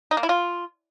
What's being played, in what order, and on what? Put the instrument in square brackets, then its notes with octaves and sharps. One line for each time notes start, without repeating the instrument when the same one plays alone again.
[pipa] D#4
A#3
E4
F4